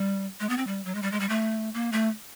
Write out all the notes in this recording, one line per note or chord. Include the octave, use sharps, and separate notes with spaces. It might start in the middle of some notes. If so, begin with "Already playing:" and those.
Already playing: G3
G#3
B3
C4
G3
F#3
G#3
G3
G#3
G3
A3
A#3
A3